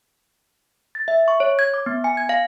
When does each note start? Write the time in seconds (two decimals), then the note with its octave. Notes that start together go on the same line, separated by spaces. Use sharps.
0.95 A6
1.08 E5
1.28 C#6
1.40 C#5
1.59 G#6
1.74 D6
1.86 B3
2.04 G#5
2.17 G#6
2.29 F5